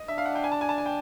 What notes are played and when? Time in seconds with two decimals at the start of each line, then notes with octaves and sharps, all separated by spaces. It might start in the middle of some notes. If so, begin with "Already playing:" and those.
Already playing: D#5
0.08 D4 E5
0.18 F5
0.26 F#5
0.35 G5
0.44 G#5
0.52 A5
0.61 G#5
0.69 A5
0.78 G#5
0.86 G5